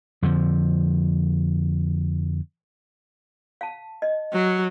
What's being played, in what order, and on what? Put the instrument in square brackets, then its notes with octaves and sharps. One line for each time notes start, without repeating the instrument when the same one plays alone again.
[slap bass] F2 D3 F3
[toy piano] F5 A5
D#5
[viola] F#3